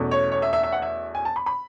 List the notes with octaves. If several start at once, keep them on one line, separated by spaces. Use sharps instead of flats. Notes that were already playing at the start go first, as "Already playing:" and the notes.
Already playing: E2 B2 A3 C#4
C#5
C#5
E5
E5
E5
F#5
E5
G#5
A5
B5
B5